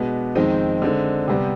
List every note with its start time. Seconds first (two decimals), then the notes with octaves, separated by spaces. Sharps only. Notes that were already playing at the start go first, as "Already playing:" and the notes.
Already playing: B2 G#3 B3 D4
0.35 F2 D#3 G#3 C4 D#4
0.82 D3 G#3 C4
1.28 C3 G3 B3